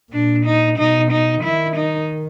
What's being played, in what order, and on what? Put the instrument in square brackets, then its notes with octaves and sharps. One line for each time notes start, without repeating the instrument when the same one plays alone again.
[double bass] A#2 [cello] D4
[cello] D#4
[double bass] B2 [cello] D#4
[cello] D#4
[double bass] D#3 [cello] E4
[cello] D#4